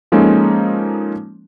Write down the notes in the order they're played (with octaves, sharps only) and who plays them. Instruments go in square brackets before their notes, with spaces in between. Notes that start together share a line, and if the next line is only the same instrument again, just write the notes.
[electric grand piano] F3 G#3 A#3 C#4 D#4 A4